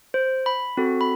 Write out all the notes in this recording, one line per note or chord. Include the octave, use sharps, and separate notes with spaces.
C5
B5
C4 F#4 A4
B5